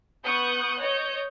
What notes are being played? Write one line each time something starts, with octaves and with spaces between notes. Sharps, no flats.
B3 C#6 D#6 F#6 G6
C#5 D#5 G6